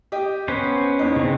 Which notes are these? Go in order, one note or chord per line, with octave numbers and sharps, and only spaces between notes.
G4 D#5
B3 C#4 B4 C5
E2 D#4
C#3 C4